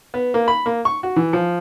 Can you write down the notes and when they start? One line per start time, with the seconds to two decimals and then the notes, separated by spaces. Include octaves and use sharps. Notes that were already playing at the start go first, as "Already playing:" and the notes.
0.14 B3
0.34 A#3
0.48 B5
0.66 A#3
0.85 C#6
1.03 F#4
1.16 E3
1.33 F3